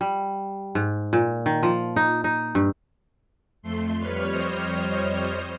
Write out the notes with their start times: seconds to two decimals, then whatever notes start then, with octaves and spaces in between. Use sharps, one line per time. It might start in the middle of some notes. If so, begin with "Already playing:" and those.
0.01 G3
0.75 G#2
1.13 A#2
1.46 D#3
1.63 F3
1.96 D#4
2.24 D#4
2.55 G2
3.62 F2 A3 C6
3.98 F2 G3 B4 C#5 F6
4.29 F2 C5 D#5